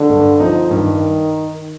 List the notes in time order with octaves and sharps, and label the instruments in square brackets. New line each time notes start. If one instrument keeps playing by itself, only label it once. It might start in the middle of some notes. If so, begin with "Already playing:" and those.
Already playing: [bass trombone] D3
[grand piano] G2
F3 C4 D#4
[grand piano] G2 [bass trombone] D#3